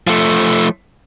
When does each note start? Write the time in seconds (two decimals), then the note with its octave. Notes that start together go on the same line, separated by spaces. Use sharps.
0.07 F3 A3